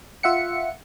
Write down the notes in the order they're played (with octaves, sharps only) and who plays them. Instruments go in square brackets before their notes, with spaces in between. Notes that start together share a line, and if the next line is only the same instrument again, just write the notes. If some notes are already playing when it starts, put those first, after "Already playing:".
[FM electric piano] F4 E5 F#5 C#7